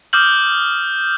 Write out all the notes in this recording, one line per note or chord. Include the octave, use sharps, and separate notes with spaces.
D6 D#6 F6 G6 F#7